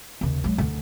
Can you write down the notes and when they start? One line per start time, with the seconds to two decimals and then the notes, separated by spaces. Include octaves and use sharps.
0.21 D#2 C#3
0.44 F#3 G#3
0.58 D2 D3